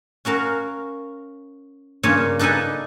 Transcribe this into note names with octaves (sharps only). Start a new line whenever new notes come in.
C#4 F#4 A#4 F5
G2 C#3 A#3 F4 C#5 G#5
D4 D#4 A4 B4 G#5